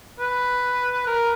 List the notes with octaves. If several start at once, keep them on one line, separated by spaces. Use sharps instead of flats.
B4
A#4